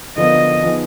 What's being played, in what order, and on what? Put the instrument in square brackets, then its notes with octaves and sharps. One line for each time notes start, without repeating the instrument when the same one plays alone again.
[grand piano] D3 F3 B3 F4 A#4 [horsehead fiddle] D#5
[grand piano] F3 B3 D#4 G#4